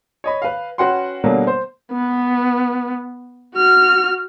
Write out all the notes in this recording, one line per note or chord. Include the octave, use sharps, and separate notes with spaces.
C#5 D#5 B5
B4 F5
C#4 F#4 B4 F#5 G5 C6
B2 D3 F#3 G3 A#3
C5
B3
F#4 F6